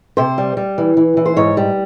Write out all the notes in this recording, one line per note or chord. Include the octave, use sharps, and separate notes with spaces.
C3 C5
G3
G3
E3
E3
E3
C5
G#2 C#5
G3